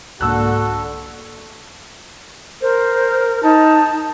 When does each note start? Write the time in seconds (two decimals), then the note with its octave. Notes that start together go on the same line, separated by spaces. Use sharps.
0.21 C2 G#2 D3 A#3 F#4 A4 E6 F#6
2.61 A#4 C5
3.43 D#4 A5